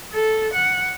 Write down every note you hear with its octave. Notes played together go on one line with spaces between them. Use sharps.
A4
F#5